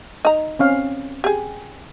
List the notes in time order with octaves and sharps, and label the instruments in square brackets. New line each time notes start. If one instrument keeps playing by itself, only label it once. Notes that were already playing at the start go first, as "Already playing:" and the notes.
[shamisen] D#4 A#5
[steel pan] C4 C#4 F5
[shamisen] G4 G#4